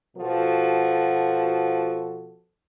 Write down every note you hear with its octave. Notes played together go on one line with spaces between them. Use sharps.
B2 F3 F#4 A4